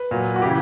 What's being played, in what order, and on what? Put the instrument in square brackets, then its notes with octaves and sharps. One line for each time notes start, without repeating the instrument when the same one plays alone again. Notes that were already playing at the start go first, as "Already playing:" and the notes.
Already playing: [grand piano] B4
A#2 F#3
F#4
C#3 E3 G4